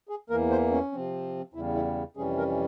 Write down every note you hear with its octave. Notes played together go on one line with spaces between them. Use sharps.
G#4
E2 E3 A#3 A#4
C5
C#4
C3 F3 C4
E2 C#3 G3 E4
E4
F2 C3 E3 G3 C#4 G#4
A#4